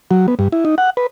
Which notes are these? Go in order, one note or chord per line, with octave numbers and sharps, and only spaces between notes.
F#3
B3
G2
E4
D#4
F#5
B4